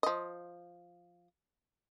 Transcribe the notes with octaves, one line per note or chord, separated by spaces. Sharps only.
F3 D#5